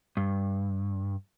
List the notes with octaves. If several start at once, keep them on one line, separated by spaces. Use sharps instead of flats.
G2